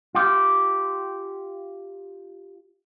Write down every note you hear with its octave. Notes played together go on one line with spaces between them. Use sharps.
F4 G4